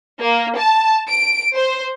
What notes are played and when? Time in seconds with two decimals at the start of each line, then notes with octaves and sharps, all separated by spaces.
0.21 A#3
0.58 A5
1.09 D7
1.56 C5